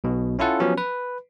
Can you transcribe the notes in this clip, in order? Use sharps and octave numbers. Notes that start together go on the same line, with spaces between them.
B1 B2
C#4 E4 F4 A4 F#5
F3 F#3 B3 C#4 G4
B4